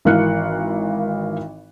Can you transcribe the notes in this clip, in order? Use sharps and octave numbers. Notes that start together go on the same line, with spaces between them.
G#1 E3 A#4 F5 F#6 C#7